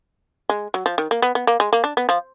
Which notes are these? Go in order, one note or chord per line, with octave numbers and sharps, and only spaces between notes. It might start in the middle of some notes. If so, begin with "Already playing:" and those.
G#3
F#3
F3
D#3
A#3
B3
B3
A#3
G#3
A#3
D4
B3
F3